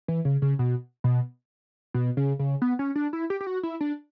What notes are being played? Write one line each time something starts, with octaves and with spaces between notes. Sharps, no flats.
E3
C#3
C#3
B2
B2
B2
C#3
C#3
B3
C#4
D4
E4
G4
G4
F#4
E4
D4